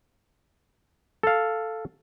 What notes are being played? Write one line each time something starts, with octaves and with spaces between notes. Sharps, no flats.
A4 F5